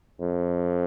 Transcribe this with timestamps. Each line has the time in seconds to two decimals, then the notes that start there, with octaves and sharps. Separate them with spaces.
0.21 F2